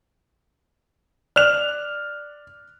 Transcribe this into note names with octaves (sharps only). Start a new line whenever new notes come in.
D5 F6 F#6 F7